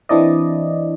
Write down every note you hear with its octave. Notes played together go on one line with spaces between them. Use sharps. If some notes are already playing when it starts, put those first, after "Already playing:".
E3 C4 D4 E4 D5 D#5